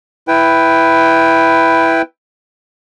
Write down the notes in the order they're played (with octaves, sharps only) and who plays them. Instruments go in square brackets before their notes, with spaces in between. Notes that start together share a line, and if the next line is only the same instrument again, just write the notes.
[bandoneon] E4 B4 G5